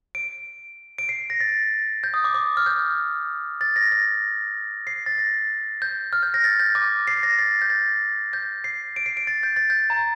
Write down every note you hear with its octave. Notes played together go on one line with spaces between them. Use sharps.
D7
D7
C7
A#6
A6
G6
D#6
D6
D6
F6
G6
A6
A#6
A#6
C7
A6
A#6
G6
F6
G6
A#6
A6
G6
D6
C7
A#6
A6
G6
A6
G6
C7
D7
C7
D7
A6
G6
A6
G6
A#5